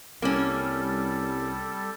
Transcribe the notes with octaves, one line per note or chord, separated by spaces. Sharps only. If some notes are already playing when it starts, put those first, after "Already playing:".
C2 G3 A#3 C#4 A4